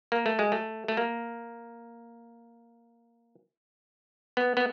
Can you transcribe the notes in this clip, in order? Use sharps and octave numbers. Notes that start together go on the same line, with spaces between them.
A#3
A3
G#3
A3
A3
A#3
B3
B3